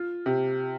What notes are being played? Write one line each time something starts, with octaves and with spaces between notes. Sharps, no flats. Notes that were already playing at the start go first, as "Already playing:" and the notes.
Already playing: F4
C3